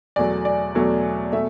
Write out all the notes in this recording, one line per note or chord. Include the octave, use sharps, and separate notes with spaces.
E2 B2 F#3 A3 D5
D5
E2 B2 F#3 A3
B2 A3 E5